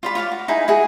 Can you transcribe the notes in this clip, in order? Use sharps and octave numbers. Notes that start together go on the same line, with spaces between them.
F4 D5 B5
F4 C#5 F5 D6
F#4
D#4 E4 G#4 G#5
E4 F#4 G#4